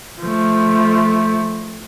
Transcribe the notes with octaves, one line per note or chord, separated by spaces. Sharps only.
F3 A3